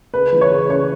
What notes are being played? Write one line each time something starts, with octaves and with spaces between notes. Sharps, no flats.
C#3 B4
E3
C#5
C#3
C#3 C#5